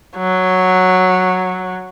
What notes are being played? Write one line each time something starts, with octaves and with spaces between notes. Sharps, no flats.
F#3